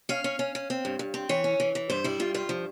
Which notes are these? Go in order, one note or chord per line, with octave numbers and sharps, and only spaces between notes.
C#4 F5
C#4
C#4
C#4
C4
G2
G2
C4
E3 C#5
C#4
E3
E3
G2 C5
G3 E4
G2 F4
G2 F4
F3